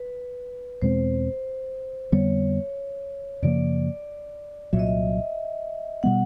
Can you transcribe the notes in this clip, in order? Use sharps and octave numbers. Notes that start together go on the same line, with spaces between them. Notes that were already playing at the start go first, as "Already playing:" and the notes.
Already playing: B4
E2 B2 G#3 C4 C5
F2 D3 G3 B3 C#5
F#2 C#3 F3 A#3 D5
C2 A#2 F#3 E5
D#5
E5
B2 G3 B3 F#5